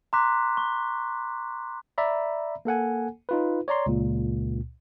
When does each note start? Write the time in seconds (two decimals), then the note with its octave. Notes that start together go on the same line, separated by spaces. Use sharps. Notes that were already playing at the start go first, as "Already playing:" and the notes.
0.13 A#5 C6 D6 F#6 B6
0.57 C#6
1.98 D5 E5 A#5 B5
2.65 A#3 A4 F#5 G#5
3.29 D#4 F4 B4
3.68 C#5 D5 A#5 C6
3.86 C#2 A#2